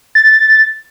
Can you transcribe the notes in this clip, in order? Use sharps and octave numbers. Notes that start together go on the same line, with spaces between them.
A6